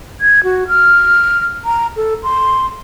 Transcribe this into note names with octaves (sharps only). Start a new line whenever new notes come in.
G#6
F#4
F6
A#5
A4
C6